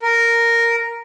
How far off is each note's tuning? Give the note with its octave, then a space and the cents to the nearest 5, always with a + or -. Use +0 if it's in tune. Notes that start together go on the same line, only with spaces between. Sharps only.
A#4 -5